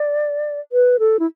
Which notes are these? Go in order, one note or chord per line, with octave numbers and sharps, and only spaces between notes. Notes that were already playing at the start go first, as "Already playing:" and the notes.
Already playing: D5
B4
A4
E4